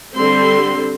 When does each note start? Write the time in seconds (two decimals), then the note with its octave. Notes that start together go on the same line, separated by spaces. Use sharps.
0.14 D3 G3 C4 C6